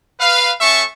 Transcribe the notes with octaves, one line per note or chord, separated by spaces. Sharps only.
B4 F5
A3 C#4 E5 A5 C#6